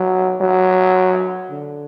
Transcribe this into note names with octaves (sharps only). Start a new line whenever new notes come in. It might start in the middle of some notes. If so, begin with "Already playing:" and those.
Already playing: F#3
F#3
D3